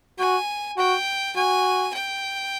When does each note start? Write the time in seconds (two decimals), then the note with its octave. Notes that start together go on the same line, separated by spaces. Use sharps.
0.19 F#4 G#5
0.77 F#4 G5
1.36 F#4 G#5
1.94 G5